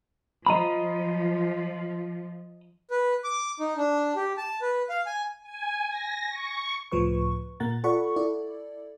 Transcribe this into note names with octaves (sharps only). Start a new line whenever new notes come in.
F3 D#5 A#5 B5
B4
D6
D#4
D4
G4
A5
B4
F5
G#5
G#5
A#6
C#6
C#2 A2 F3 B4 C#6
A#2 A#3 F#5 A#5 A6
F4 A4 D5 F#5 B5 C#6
E4 A4 D5